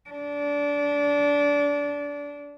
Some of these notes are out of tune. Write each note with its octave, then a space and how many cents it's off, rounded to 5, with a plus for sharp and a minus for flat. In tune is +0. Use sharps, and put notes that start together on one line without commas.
D4 -25